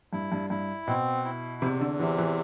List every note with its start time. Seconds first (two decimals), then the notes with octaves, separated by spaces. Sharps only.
0.13 G2 E4
0.32 G2
0.50 G2 E4
0.87 B2 C4
1.25 E4
1.62 E2 C3
1.81 D3
1.99 C3 E3
2.18 E3